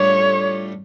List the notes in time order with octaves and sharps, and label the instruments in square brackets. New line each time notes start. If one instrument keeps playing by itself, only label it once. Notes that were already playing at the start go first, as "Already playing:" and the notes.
Already playing: [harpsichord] A2 G3 D4 F4 [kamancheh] C#5